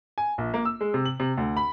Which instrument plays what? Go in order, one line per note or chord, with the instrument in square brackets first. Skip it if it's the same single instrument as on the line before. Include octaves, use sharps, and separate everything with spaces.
[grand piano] G#5
A#1
A#3
E6
G#3
C3
F#7
C3
D2
B5